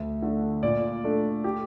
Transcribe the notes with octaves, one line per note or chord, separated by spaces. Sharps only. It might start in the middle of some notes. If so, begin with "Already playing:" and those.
Already playing: D2
D3 A3
A#2 D5
A3 D4
G4